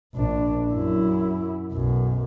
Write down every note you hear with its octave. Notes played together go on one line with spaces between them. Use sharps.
A#1 D4
F#2 E4
B1 F#2